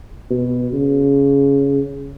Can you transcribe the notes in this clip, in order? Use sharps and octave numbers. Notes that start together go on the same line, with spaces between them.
B2
C#3